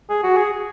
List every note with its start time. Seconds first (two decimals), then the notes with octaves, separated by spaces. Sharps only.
0.10 G#4
0.24 F#4
0.37 G#4